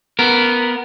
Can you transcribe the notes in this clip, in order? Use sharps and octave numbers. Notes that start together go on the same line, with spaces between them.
B3 A#4